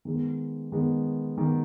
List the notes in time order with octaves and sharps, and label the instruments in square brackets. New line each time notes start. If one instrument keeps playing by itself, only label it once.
[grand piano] D#3 G#3 B3
D#3 G#3 B3
D#3 G#3 B3